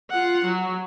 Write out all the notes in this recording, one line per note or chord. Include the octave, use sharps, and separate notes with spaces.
F4 F#5
F#3